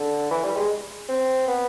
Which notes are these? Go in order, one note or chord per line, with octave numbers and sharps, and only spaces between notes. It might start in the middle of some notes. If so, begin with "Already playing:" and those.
Already playing: D3
E3
G3
G#3
C4
B3